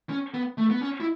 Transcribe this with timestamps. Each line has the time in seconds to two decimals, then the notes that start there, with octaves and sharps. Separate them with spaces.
0.09 C#4
0.34 B3
0.58 A3
0.70 B3
0.81 C#4
1.00 E4